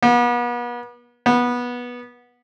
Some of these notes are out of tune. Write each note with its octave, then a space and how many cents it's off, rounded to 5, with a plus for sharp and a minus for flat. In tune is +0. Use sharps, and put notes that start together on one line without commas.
B3 -35
B3 -15